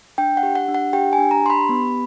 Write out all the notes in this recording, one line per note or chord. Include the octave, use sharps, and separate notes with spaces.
D4 G5
F#5
G4
F#5
D4
F#5
G4 G5
G#5
D4
A#5
G4 C6
B5
B3